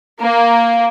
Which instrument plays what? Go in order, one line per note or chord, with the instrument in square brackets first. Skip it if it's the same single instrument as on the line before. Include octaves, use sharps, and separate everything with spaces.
[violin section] A#3